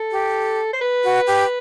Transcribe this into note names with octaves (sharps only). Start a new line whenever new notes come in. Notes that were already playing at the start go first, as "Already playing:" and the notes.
Already playing: A4
G4
C5
B4
F#4
G4